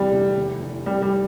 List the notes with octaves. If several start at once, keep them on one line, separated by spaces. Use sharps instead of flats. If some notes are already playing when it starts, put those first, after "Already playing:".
Already playing: E2 C3 E3 G3
F1
E2
E3
C3 G3
G3